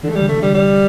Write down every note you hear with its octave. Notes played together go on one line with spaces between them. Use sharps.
D3 E3
A3
G3
D3
C3 A3
D3 G3
G3